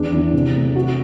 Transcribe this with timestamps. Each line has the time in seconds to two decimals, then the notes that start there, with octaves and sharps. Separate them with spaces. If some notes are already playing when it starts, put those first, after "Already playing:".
Already playing: E2 D4
0.13 E3
0.34 C3
0.55 A3
0.76 F#4